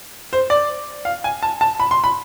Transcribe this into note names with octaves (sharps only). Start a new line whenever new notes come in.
C5
D5
F5
G#5
A5
A5
B5
C6
B5